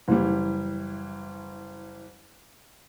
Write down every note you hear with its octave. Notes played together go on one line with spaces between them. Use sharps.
F#1 E3 G3